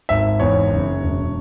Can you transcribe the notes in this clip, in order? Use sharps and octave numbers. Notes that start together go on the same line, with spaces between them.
G#1 E5
E2 C#5
F#1
E1